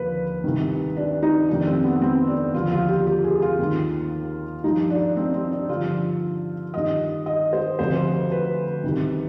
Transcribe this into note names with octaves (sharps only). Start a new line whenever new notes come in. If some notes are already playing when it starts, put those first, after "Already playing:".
Already playing: D#2 D3 F3 B4
C2 C3 D#3
D4
D#4
F2 C3 D#3 D4
C4
B3
C4
D4
D#2 D3 F3 F4
F4
G4
G4
G#4
F4
D#2 D#3
G2 F3 D#4
D4
C4
C4
D4
G2 D3 F3 F4
G2 D#3 D#5
D#5
C5
D2 C3 F3 C5
B4
C2 C3 D#3